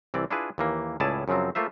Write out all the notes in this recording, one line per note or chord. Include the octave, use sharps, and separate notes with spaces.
C2 E3 C4 D5
D4 E4 F4 G#4 B4
D#2 E3 A#3
C#2 A2 E4 G#4 D5 A5
F#2 C#3 F3 F#3 C4
A3 A#3 F4 C5 E5